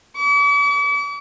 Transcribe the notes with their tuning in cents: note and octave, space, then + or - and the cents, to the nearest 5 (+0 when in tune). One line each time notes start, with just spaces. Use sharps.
D6 -45